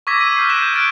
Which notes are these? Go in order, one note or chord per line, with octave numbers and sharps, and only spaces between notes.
C#6 D6 E6 G#6 A#6 B6
E6 D#7
F6 G6 C7
F#6 G6 B6 D7 E7
G6 D7
F6 F#6 A6 D7